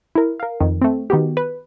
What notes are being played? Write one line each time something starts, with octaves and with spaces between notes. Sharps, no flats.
E4 A#4
A#4 F5
F2 D#3
A3 C4
D#3 B3 F#4 G4
B4